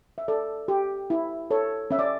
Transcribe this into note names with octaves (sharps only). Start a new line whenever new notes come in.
E5
A4 D5
G4
E4
A4 C#5
C#4 E5
D5